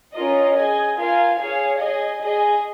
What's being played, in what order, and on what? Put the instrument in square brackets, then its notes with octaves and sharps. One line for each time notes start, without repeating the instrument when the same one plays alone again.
[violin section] C#4 F4 A#4 D#5
G#4 D#5 G#5
F4 A#4 F5 G#5
G#4 C#5 F5 G#5
G#4 D#5 G#5
G#4 D#5 G#5